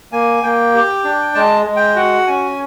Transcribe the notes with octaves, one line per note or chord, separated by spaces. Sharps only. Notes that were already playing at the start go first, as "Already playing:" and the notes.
A#3 G#5
A#3 G5
G4
D4
G#3 A5
G#3
G5
F#4 F#5
C#4 G#5